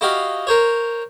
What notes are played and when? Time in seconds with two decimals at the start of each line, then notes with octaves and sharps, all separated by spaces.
0.01 E4 F#4 G4 D#5 F5
0.47 A#4 C5 C#5